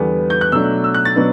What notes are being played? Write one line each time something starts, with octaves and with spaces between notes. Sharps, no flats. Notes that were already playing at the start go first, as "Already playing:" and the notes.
Already playing: E2 D3 G3 B3
G6
F#6
B2 F#3 A3 D4 E6
E6
F#6
A6
B2 F#3 B3 D4